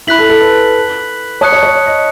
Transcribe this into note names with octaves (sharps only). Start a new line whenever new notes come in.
E4 B5 F#6 B6 F#7
A4
A4
B4
C#5 A5 D#6 F#6 C#7
C#5
C#5
D#5